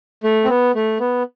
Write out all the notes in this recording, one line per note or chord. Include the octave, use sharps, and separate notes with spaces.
A3
C4
B3
A3
B3